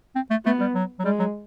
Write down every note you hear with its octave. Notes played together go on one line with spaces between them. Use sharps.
C4
A3
A3 B3
G3
F#3
F#3
G3 G#3
F#3